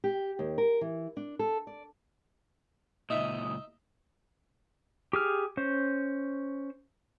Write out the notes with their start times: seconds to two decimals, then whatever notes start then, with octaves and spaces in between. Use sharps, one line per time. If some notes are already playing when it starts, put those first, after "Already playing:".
0.04 G4
0.39 D#2
0.58 A#4
0.81 E3
1.17 D4
1.39 A4
1.67 D5
3.10 C#2 A#2 D#4 E5 D#6
5.13 G4 G#4 F6
5.57 C#4 C5